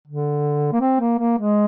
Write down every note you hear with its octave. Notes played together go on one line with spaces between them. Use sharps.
D3
A#3
C4
A#3
A#3
G#3